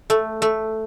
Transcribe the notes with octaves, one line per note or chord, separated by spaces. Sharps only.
A3
A3